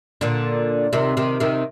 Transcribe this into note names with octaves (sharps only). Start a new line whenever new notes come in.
A#2 D3
C3 D#3
C3 D#3
C3 D#3